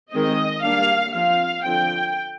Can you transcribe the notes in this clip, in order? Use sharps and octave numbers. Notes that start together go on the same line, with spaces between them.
D#3 G#3 C4 D#5
G3 A#3 D4 F5
F3 C4 F5
D3 F3 C4 G5